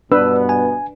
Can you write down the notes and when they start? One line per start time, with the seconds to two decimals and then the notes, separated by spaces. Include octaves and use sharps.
0.12 G2 B2 B3 D4 B4 E6
0.49 G#5